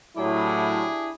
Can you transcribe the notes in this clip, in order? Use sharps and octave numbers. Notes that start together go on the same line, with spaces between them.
A2 F#3 D4 E4 G4 G#4